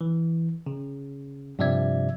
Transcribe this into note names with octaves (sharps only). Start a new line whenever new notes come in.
E3
C#3
G2 C3 F3 D5 E5 G#6